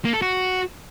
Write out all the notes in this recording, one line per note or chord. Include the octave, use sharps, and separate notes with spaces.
A#3
A4
F#4